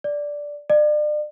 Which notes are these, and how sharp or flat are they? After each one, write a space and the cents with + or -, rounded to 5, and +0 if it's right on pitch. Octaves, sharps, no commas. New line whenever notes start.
D5 -5
D5 +35